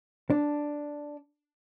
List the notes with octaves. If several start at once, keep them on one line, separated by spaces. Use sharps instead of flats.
D4